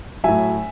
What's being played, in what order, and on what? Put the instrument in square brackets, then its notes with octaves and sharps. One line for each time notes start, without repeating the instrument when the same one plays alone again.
[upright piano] A2 F#3 E5 G#5